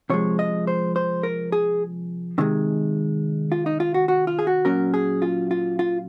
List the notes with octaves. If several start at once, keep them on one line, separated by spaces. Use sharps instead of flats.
C3 F3 G#3 C#5
D#5
C5
C5
A#4
G#4
C3 D#3 G#3
F4
D#4
F4
F#4
F#4
F4
G#4
F#4
A#2 F#3 C#4 A#4
G#4
F4
F4
F4